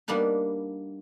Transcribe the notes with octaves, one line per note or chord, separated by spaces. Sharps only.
G3 A#3 B3 D4 D#4